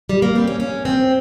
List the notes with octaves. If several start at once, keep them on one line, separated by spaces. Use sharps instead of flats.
G3
A#3
C4
C#4
C#4
C4